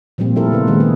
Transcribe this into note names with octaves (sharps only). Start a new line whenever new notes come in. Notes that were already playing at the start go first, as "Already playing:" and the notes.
A#2 F3 G3 A#3 C4
G3 A3 E4 F4 A4 A#4
C#3 B3 B4
D#3 G#3 A#3
G#4